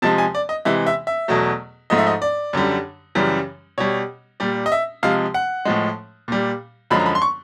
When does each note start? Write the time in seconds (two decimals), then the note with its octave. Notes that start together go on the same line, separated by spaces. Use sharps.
0.02 C3 F3 G#3 A5
0.18 G#5
0.35 D5
0.49 D#5
0.65 C3 E3 G#3 E5
0.87 E5
1.07 E5
1.28 E2 B2 F#3 A3
1.90 G#2 F3 A3 D#5
1.98 E5
2.07 D#5
2.22 D5
2.53 F#2 D3 G3
3.15 F#2 C#3 E3 G3
3.78 B2 G3 C#5
4.40 A#2 G3 D5
4.66 D#5
4.72 E5
5.03 C3 F3 G#3 F5
5.34 F#5
5.65 A2 F3 G#3
6.28 A#2 G3
6.91 F#2 D3 F3 G#3 B5
7.00 A#5
7.06 B5
7.15 C6
7.22 C#6